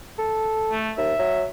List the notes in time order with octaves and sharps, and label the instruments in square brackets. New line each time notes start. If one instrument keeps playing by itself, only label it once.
[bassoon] A4
[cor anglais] A3
[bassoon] D#2 [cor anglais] E5
[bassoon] F#3